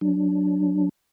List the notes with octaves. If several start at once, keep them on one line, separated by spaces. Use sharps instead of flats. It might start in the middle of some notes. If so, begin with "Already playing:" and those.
F#3 D4